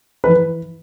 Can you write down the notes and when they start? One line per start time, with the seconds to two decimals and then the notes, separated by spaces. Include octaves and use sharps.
0.24 B4
0.27 E3